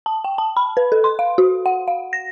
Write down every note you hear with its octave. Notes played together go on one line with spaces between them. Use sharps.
A5
G5
A5
B5
B4
A4
C6
F5
F#4
F#5
F5
A#6